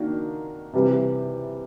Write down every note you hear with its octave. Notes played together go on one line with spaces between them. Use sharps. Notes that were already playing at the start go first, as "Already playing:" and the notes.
Already playing: D#3 A#3 D4 F#4
C3 E3 G3